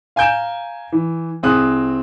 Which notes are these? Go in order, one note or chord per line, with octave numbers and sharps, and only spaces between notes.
F5 G#5 A#5 G6 D7 E7
E3
C2 C4 G#4 D#6 F#6